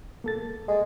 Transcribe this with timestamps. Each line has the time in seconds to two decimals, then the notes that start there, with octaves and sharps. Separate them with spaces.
0.24 A#3 A4 A6
0.68 G#3